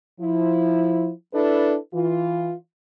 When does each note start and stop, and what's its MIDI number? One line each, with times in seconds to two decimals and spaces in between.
0.20 1.10 53
0.20 1.10 64
1.33 1.75 62
1.33 1.75 64
1.33 1.75 69
1.33 1.75 71
1.94 2.54 52
1.94 2.54 65